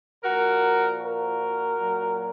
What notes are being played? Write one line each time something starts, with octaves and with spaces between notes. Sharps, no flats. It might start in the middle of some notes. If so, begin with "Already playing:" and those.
A#2 F3 F#4 A#4
F#4 A#4
A#2 F#3